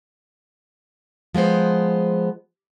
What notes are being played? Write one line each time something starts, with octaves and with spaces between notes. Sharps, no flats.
F3 G#3 B3 C5